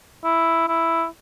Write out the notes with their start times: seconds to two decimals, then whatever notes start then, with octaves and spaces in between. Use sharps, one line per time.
0.24 E4
0.68 E4